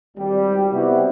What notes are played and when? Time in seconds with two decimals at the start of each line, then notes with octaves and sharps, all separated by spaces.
0.17 G#1 G3
0.71 C3 G3 B3 E4 F#4 G4